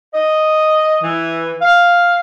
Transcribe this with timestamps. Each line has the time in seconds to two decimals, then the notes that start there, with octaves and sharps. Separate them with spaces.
0.13 D#5
1.03 E3
1.62 F5